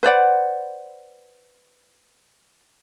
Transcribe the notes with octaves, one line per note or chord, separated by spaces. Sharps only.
B4 C5 D5 F#5